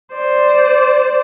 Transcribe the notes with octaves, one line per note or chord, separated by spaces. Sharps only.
C5 D5